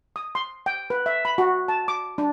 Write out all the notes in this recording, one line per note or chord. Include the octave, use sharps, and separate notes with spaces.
D#6
C6
G5
B4
E5
B5
F#4
A5
D6
D4